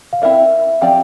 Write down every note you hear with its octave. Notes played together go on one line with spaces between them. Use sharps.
F5
C4 E4 A#4 D5 E5
F3 C4 G4 D5 F5